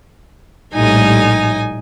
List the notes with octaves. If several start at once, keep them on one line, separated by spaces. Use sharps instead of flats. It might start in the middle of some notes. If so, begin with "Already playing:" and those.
A#1 A2 G3 D#4 G#5